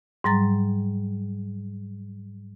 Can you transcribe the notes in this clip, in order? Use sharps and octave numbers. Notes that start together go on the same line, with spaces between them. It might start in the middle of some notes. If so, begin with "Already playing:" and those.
G#2 F#3 G3 A#5 A6